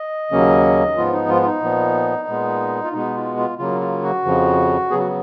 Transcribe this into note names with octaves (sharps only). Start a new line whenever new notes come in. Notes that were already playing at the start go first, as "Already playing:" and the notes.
Already playing: D#5
D#2 C#3 F#3 A#3 C#4
G#2 F3 B3 F4
D#4
F4
F4
D#4
A#2 F3 B3
A#2 G#3 B3
F4
B2 G#3 B3 D#4
F4
F4
C#3 F#3 A#3 F4
F4
F#4
F2 C#3 F3
C#3 F#3 B3 G#4
F#4